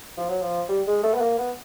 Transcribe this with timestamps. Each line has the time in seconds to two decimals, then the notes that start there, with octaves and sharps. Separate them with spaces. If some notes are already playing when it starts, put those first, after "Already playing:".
0.18 F3
0.29 F#3
0.42 F3
0.69 G3
0.87 G#3
1.03 A3
1.14 B3
1.21 A#3
1.38 B3